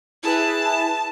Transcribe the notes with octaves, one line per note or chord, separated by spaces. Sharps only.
E4 G#4 B4 A5